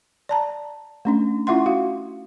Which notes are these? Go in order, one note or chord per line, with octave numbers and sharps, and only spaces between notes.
D5 A5 A#5
A3 C#4 D4
C#4 E4 F4 E5 F#5 C6
F#4 F5